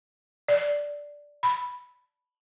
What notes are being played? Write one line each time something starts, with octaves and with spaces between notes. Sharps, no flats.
D5
B5